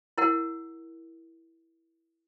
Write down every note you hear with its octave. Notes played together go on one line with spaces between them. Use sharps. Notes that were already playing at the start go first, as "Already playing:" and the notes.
E4 A#4 F#5